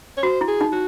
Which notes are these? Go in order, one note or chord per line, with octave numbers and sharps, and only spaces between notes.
C#5
F#4 C5
E4
G#4
D#4
F#4